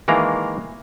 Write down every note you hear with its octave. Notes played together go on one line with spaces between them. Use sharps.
D#3 E3 G#3 A#3 A#5